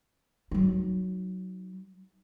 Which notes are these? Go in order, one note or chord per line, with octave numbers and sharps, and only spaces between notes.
F#3 D#4